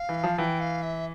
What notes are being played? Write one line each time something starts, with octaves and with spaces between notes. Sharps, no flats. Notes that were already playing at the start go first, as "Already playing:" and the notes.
Already playing: F5
E3
F3
E3 G5
F5
E5